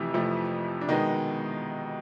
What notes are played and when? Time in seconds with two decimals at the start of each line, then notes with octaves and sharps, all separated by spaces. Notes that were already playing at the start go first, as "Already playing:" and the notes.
Already playing: F2 C3 E3 F3 A3 E4
0.14 F2 C3 F3 A3
0.81 D4
0.89 B2 D#3 G#3 B3 D#4